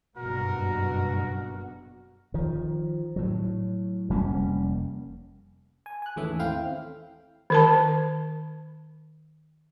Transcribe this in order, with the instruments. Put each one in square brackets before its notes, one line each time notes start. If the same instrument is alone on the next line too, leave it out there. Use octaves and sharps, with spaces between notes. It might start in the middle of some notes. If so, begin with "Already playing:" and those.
[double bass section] F#1 G2 B2 [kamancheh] F#4 [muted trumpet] A#4
[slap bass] D#3 F3
A2 F#3
F1 G3 A#3 C#4
[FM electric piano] G#5
G#5 F#6
D#2 G#2 E3 A3 C#4 E5
A3 C4 E4 F5 G5 F6
[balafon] D#3 A#4 A5